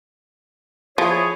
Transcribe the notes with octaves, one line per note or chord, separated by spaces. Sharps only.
F3 E4 G#4 C#5